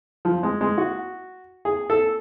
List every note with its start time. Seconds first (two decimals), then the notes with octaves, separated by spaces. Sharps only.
0.25 F3
0.43 G#3
0.61 G#3
0.78 F#4
1.65 G#4
1.90 A4